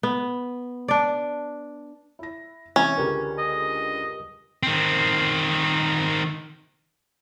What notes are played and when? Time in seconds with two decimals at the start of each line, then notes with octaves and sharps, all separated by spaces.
0.03 B3
0.88 D4 D5
2.19 E4 A#6
2.76 C3 E3 C#4
2.97 C#2 D3 G4 A#4 B4
3.38 D#5
4.63 D#3 C4